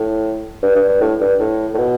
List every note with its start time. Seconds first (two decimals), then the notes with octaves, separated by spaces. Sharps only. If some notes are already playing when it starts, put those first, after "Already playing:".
Already playing: A2
0.63 G2
0.75 G2
0.88 G2
1.01 A2
1.21 G2
1.39 A2
1.74 A2
1.78 B2